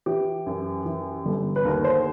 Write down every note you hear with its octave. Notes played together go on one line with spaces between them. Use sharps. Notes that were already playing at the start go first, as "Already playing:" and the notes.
E3 G4
F#2
E3
G1
B4
D#2 A#4
C5